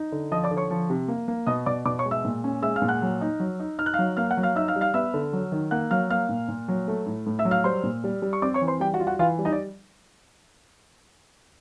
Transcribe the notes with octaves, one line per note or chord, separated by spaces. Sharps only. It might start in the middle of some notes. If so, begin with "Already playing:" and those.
Already playing: D#4
D3
F3 D#5 D#6
D5 D6
D3
C#5 C#6
F3
C3
A#3
A#3
B2 D#5 D#6
B2 D5 D6
B2 D5 D6
C#5 C#6
G#3
E5 E6
A#2
C#4
G#3 E5 E6
F5 F6
A#2
F#5 F#6
F#3
D#4
F#3
D#4
D#4 F6
F#6
F5 F6
F#3
A#3 F5 F6
F#5 F#6
F#3
F5 F6
D#4 E5 E6
F5 F6
G3
F5 F6
B3 E5 E6
D3
F#3
D#3
A#3 F#5 F#6
F#3 F5 F6
A#3 F5 F6
A#2
A#2
F#3
A3
A2
A2
E5 E6
F#3
F5 F6
G3 C5 C6
A#2
G3
G3
C#6
C4 D5 D6
C#5 C#6
E3
C5 C6
G3 G4 G5
F#4 F#5
F4
F#4 F#5
E3 F4 F5
G3
D#4 D#5
D5